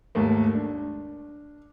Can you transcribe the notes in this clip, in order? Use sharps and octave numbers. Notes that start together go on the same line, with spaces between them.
D#2 G#2 A3 A#3
D4